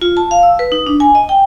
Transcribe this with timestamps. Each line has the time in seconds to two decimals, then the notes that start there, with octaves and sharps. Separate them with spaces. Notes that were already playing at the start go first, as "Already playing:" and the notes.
0.01 F4
0.17 A5
0.31 F5
0.43 E6
0.59 B4
0.72 D#4
0.86 D4
1.00 G#5
1.15 D#5
1.29 G5